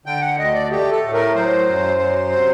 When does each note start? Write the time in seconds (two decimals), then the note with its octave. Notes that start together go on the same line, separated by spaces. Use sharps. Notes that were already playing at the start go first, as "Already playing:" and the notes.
0.06 D3 G5
0.21 F#5
0.38 D2 D#5
0.54 D5
0.70 A3 G4
0.92 A4
1.03 A2
1.14 A#4
1.35 F#3 C5
1.67 F#2
2.00 F#3
2.33 C3